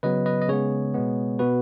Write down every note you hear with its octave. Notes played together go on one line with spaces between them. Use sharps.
C#3 F#3 B3 B4 D#5
B4 D#5
D#5
C#3 G#3 B3 G#4 C#5
B2 G#3 B3
B2 B3 F#4 B4